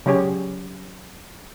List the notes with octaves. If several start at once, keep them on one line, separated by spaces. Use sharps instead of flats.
C#3 F#3 G4 G#4 C#5